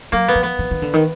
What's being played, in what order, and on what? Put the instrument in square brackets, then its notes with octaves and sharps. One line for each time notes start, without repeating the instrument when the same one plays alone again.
[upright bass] F#3 [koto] A#3
[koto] B3
[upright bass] F3
[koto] B3
[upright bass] E3
D#3
D3
D#3